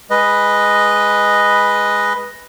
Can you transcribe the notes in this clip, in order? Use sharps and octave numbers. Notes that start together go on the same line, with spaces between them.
G#3 B4 D#5